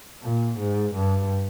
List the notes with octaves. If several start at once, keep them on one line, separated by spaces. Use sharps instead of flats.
A#2
G#2
G2